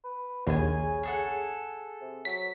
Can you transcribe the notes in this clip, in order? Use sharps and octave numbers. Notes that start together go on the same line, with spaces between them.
B4
A#1 D#2 C#3 G#4 G#5
G#4 A4 F#5
C3
F#3 B6